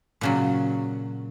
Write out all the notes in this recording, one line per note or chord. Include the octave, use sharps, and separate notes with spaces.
A#2 C#3 F#3